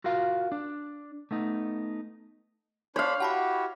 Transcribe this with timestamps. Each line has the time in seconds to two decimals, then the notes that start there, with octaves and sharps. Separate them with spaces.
0.04 F4 F#4 A#4 F5
0.52 D4
1.31 A3 B3 D#4
2.96 D4 C5 C#5 F5 B5
3.20 E4 F#4 G4 F#5 A5 B5